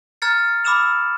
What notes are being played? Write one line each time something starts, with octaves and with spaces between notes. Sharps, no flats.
A#5 F6 G#6 A6 C#7
B5 D6 E6 F6 E7 F7